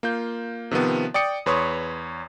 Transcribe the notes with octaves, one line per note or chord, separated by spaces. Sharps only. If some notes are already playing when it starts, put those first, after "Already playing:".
A#3 F4 G6
C3 D#3 F3 B3
D5 G5 D#6 C#7
E2 B4 C#5 C6 C#6 D#6